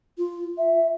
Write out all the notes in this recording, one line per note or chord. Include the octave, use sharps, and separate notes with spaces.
F4
E5